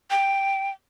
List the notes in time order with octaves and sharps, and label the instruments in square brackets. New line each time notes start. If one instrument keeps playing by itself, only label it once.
[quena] G5